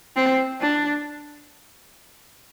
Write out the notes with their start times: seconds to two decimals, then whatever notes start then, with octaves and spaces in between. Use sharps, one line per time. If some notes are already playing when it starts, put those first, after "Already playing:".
0.16 C4
0.61 D4